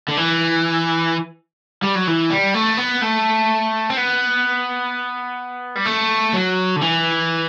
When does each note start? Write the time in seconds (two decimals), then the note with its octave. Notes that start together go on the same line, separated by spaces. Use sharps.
0.09 D3
0.17 E3
1.83 G3
1.95 F#3
2.08 E3
2.31 G3
2.54 A3
2.78 B3
3.02 A3
3.90 C4
3.97 B3
5.76 G3
5.86 A3
6.34 F#3
6.76 D3
6.81 E3